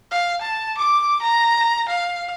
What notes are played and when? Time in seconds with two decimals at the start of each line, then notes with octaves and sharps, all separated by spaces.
0.11 F5
0.41 A5
0.78 D6
1.22 A#5
1.89 F5